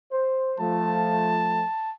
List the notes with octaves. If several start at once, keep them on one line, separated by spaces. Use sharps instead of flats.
C5
F3 A3 A5